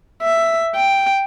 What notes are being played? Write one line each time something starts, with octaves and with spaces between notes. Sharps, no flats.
E5
G5